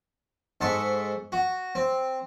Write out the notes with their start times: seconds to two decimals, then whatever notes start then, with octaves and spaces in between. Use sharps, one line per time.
0.61 G#2 A4 C5 C6 C#6
1.32 F#4
1.75 C4